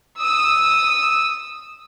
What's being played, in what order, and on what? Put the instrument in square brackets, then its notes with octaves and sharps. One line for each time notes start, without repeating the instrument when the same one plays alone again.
[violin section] D#6 E6